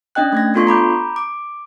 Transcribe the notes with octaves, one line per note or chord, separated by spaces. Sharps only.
C#4 D4 D#5 G5 F#6
A3 G#6 A#6
B3 D4 F4 A4 C6 C#6
A#5 B5 D6 G6
D6